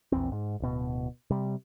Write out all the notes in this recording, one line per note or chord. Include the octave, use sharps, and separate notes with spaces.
A#1 E2 C4
G#2
D1 B2
C3 G3